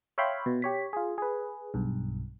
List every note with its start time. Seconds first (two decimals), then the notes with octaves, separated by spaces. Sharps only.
0.18 C#5 E5 F5 G5 B5 C6
0.46 B2
0.62 G4 C#5 B6
0.93 F4 G#4
1.18 G#4 B4
1.74 B1 G2